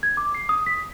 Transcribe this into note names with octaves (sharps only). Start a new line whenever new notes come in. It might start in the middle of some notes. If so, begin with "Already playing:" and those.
G#6
D6
C7
D#6
B6